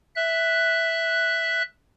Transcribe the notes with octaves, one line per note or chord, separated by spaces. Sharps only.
E5 F#6